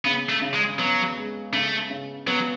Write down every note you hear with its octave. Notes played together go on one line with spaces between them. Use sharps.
C#3 B3
A3
C#3
G#3
F#3 B3
G#3
C#3 A3
C#3
F#3 B3